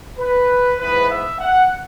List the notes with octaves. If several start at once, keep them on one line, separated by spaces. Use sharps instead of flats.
B4
G#2 E3 B3 B4
E5
F#5